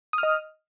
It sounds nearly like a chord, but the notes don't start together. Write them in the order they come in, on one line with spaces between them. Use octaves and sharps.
D#6 F6 D#5